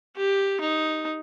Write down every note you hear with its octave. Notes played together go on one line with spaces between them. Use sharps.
G4
D#4